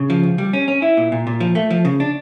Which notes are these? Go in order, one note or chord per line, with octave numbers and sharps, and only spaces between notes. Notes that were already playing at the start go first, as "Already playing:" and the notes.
Already playing: C#3
F3
C#2
G3
C#4
C#4
E4
A#2
A#2
A#2
F3
A3
F3
C#3
D4